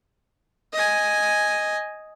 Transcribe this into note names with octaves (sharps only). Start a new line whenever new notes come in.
D#5 G#5